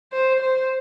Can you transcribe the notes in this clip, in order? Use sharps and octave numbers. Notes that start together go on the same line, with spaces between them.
C5
C5